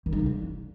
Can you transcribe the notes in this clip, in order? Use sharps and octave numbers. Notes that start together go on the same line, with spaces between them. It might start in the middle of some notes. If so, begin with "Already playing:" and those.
D#3
D#4
C#3
D4